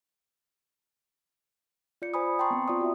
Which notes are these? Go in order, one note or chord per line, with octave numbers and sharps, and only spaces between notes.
F4 D5 G6 C#7
C5 G#5 B5 D#6
G5 A5 A#5 C6 C#6
B3 C4
F4 D5 D#6
F#4 E5